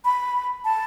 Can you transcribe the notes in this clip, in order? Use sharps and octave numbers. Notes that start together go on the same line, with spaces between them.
B5
A5